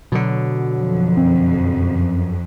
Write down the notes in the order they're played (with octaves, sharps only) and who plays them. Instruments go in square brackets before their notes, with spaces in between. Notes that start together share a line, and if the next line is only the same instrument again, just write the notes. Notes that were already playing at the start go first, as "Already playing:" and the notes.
[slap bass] B2 D3 [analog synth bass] F#3
[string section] F2
[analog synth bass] F#2 [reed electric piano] C4